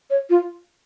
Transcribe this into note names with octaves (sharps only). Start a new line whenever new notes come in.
C#5
F4